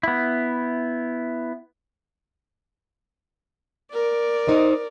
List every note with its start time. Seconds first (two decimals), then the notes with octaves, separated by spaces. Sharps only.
0.03 B3 E4
3.93 A#4 D5
4.48 D#4 C5 D#5